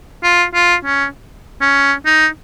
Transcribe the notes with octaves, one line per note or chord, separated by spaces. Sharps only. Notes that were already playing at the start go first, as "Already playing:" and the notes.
F4
F4
C#4
C#4
D#4